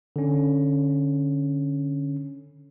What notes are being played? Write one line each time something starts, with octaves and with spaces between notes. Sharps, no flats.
D3 C#4